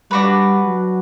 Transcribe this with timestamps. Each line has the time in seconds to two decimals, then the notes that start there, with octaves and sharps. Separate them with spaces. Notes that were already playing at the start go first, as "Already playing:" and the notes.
0.11 G3 D4 F#4 B4
0.66 F#3